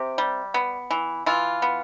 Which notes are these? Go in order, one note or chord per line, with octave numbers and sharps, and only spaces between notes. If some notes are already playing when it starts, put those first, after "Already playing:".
Already playing: C3 G4
G3
B3
E3
E3 F4
B3